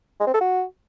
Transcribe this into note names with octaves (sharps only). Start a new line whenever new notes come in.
G#3
C4
A4
F#4